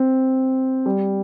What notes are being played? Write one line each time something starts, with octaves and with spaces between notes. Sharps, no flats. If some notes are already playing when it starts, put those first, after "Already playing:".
Already playing: C4
G3